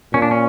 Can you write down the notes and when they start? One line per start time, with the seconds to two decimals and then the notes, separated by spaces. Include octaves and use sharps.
0.13 A#2 C#4
0.22 D4
0.31 C#4